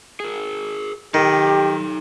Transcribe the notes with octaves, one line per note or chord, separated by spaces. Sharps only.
G#4 A#4
D#3 D#4 G4 A4